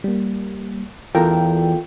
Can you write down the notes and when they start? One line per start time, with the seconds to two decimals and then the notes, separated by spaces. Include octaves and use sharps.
0.04 G3 A#3
1.15 E2 F4 A4 A#4 G5